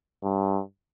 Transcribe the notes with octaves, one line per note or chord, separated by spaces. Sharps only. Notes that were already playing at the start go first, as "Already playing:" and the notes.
G2